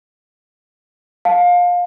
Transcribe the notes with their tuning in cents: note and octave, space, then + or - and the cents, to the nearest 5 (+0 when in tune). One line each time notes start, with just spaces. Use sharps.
F5 +25 A5 +0